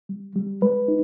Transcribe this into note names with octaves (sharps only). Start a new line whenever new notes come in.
G3
G3
G#3 B4
D#4